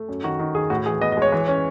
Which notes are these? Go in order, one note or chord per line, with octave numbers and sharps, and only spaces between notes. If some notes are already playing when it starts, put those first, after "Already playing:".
Already playing: A3
F#2
D#3 F#4
D#3
D#3 G#4
A2 F#4
E3 G#4
B3 D#5
D#5
G#3 C#5
E3
C#4